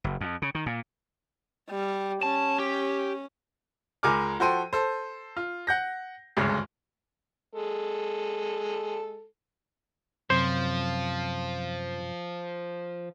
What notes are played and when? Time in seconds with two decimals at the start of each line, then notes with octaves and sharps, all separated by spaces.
0.04 F#1
0.21 F2
0.42 C#3
0.55 D#3
0.66 A#2
1.71 G3
2.23 C#4 A5
2.59 G4
4.03 C#2 G#3 A#4 G#5 D6 F6
4.40 F3 F#4 A4 G5 C6 D#7
4.73 A4 C5
5.37 F4
5.67 F#5 G6 A#6
6.37 G#1 D2 G2 C#3 G#3
7.54 G#3 A4
10.30 F#2 C3 F3 C5